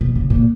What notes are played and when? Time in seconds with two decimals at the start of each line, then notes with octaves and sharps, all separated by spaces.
0.01 B2
0.15 C#3
0.30 A#2